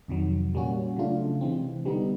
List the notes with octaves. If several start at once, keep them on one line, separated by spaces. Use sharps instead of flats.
F2 C3 D#3 F#3
A#2 G3 A#3 C#4 F#4
C#3 F#3 A3 D4 F4
C3 E3 G#3 C4
D3 G3 B3 D#4